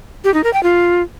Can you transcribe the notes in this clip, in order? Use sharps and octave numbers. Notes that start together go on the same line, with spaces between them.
G4
D#4
A#4
G5
F4